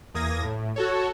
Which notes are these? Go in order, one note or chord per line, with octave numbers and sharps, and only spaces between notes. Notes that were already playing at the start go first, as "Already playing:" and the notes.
E2 A#3 D#6 G#6 A#6
A2
F#4 A4 C#5